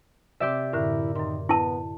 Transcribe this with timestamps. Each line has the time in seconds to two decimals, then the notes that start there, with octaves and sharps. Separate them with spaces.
0.40 C3 C4 G4 D5 E5
0.73 F#2 A2 D3 E4 A#4
1.16 F#2 D#3 C6
1.49 B3 E4 A5